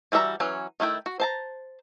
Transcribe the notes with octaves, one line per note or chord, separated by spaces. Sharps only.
E3 G3 F#4 E5 A#5
E3 F#3 C#4
D#3 A3 E4 G5
F#4
C5 A5 A#5